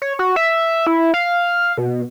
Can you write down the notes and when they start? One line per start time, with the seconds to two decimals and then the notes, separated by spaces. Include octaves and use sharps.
0.02 C#5
0.19 F#4
0.36 E5
0.87 E4
1.14 F5
1.78 B2